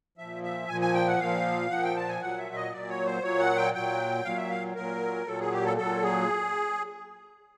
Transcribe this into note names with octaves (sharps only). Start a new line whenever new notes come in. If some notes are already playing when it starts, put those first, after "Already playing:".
A#2 F3 E5
E5
A#2 F3 G#5
G#5
G5
F#5
A#2 F3 F5
A#2 F3 F#5
G5
A5
G#5
A#2 F#3 F#5
E5
D#5
A#2 F#3 D5
C#5
C5
A#2 F#3 C#5
F#5
G5
A#2 F#3 G5
A#2 F#3 F5
E5
F5
A#2 F#3 A#4
A#2 F#3 A4
G#4
G4
A4
A#2 F#3 A4
G#4